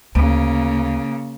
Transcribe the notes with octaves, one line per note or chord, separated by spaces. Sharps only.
D2 C#3 A#3